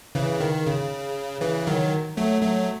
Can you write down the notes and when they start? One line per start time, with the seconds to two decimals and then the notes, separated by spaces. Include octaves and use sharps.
0.15 C#3 E3
0.40 D#3
0.67 C#3
1.41 C#3 E3
1.67 D#3 F#3
2.17 F#3 A3
2.42 F#3 A3